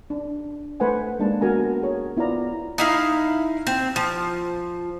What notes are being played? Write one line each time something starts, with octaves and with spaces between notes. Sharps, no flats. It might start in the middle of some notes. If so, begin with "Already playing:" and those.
D4
A3 B4 C5 F#5 G#5
G#3 A#3 D4 A5
B3 F#4 A#4 G#5 A#5
G#4 C#5
B3 E4 F4 D5 A#5
D#4 E4 F5
C4
F3